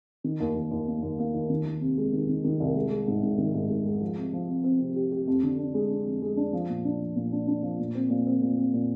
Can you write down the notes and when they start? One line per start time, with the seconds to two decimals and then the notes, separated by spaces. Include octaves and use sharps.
0.24 D#3
0.40 D#2
0.55 D#2
0.71 D#2
0.88 A#3
1.03 D#2
1.19 A#3
1.34 D#2
1.50 D#3
1.66 D#3
1.81 C3
1.98 G#3
2.13 D#3
2.29 D#3
2.44 D#3
2.60 C2
2.76 G#3
2.92 G#3
3.08 G#2
3.23 G#2
3.38 D#3
3.54 G#2
3.70 G#2
3.85 G#3
4.01 F3
4.17 C3
4.33 F3
4.48 C4
4.64 C4
4.80 C3
4.96 G4
5.12 G4
5.27 F2
5.43 D3
5.59 D4
5.74 G#3
5.90 D4
6.05 F2
6.22 G#3
6.37 D4
6.53 F3
6.69 A#2
6.85 D4
7.00 F3
7.16 A#2
7.32 D4
7.48 D4
7.63 F3
7.79 A#2
7.95 C4
8.10 A#2
8.27 C4
8.42 A#2
8.58 C4
8.74 A#2